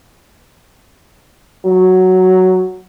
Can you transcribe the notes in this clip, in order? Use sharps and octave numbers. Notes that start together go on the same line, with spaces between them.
F#3